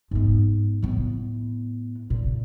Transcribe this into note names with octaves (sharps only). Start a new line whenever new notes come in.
G#2 B3
A2 B3
A#2